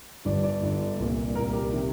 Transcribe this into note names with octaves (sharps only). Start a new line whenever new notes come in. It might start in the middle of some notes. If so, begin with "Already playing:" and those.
G1 G2 D3 D5
D5
G1 G2 D3
C2 A#2
C2 A#2 A#4
G4
C3 D#3